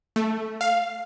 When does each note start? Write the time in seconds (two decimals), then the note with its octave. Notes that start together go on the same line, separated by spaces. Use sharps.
0.16 A3
0.61 F5